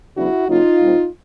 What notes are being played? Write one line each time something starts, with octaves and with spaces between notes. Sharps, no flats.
E2 C#3 F#3 B3 D4 E4 F#4
C#3 F#3 A#3 C#4 D#4 F4
A#2 G3 C4